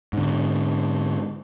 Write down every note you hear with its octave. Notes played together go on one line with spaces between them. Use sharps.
G#2 D3